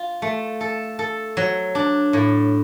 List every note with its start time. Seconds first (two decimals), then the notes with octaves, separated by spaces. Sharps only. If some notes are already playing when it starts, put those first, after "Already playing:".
Already playing: F4
0.22 A3
0.61 A4
0.99 A4
1.37 F#3
1.75 D4
2.13 A2